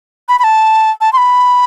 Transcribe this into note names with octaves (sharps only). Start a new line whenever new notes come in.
B5
B5
A5
A5
C6
B5